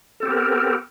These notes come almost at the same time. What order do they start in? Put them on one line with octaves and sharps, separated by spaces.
A4 C4 G4 B3 A#4